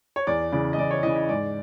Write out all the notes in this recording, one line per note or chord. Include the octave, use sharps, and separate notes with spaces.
C#5
E2 D5
C#3 E3 D5
D#5
E2 D5
C#5
C#3 E3 D#5
D#5
G#2 D5